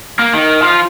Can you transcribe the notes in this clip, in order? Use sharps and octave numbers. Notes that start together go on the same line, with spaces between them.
A#3
D#3
F3 F4